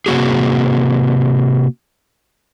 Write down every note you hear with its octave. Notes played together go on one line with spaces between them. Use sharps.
C3 F#3 A#3 F#4 G#4